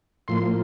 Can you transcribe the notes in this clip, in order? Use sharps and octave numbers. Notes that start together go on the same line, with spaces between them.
A2 F3 A#3 C6